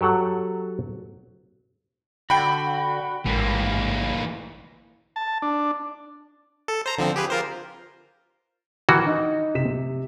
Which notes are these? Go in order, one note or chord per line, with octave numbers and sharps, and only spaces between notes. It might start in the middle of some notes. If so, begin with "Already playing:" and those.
F#3 G4 A4 F#5
D3 F#4 G5 B5
A1 G#2 E3 A#3
A5
D4
A4
C5 A#5
D3 F3 C4
G4 G#4 B4
F4 A#4 C5
D#3 E3 F#4
D#4
C3 B6 E7